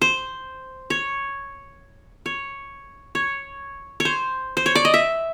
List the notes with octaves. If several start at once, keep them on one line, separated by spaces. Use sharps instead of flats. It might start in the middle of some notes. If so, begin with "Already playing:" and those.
C5
C#5
C#5
C#5
C#5
C5
C5
C#5
D5
D#5
E5